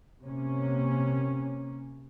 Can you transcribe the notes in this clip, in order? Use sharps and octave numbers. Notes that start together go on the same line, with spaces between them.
C3 A#3 C#4